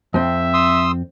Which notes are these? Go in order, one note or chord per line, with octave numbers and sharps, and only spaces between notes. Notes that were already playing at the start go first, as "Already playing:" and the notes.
F2 C4 E5
C6 D#6 E6